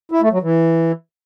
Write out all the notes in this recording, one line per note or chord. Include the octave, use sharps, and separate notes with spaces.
E4
A3
F#3
E3